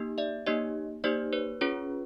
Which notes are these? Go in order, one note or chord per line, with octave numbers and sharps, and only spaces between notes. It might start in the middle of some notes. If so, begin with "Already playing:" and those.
Already playing: A#3 D#4 G4
D5 E5
A#3 D#4 G4 C#5 D#5
A#3 D#4 G4 C5 D5
B4 C#5
C#4 F4 G#4 B4 C#5